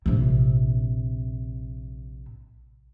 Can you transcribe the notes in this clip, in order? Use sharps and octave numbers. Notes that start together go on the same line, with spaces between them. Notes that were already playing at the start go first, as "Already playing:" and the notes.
A#1 C3